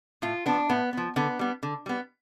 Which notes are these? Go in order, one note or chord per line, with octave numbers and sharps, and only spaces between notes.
A2 F4
F3 B3 D4
A2 B3
F3 B3
D3 B3
G3 B3
D3
G3 B3